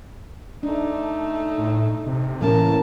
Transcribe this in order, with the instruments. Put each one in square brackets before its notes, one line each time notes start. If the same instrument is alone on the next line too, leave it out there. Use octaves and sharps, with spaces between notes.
[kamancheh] A3 D#4 [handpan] D4
[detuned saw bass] A2
C3
[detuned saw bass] A2 [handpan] E3 A#3 C#4 [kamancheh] A#4 A5